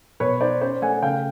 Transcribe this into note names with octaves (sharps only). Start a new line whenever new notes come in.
B2 B4 C#5
D#4 C5 D5
C#4 C5 D5
A3 F#5 G#5
C#3 F5 G5